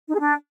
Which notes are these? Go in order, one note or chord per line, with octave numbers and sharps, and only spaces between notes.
D#4
G#4
D4